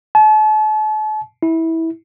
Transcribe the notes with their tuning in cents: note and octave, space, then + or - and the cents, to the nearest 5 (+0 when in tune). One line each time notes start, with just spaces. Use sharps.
A5 -40
E4 -20